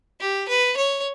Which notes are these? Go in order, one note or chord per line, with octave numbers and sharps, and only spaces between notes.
G4
B4
C#5